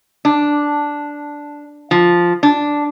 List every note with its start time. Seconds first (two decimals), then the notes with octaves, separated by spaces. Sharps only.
0.25 D4
1.91 F3
2.43 D4